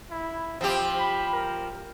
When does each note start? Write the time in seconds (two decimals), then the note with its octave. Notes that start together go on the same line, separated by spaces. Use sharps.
0.10 E4
0.61 F3 C4 G4
0.99 B5
1.33 A#4